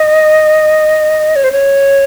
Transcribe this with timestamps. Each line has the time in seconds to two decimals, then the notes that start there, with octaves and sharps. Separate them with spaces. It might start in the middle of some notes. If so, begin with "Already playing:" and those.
Already playing: D#5
1.36 C#5
1.44 C5
1.52 C#5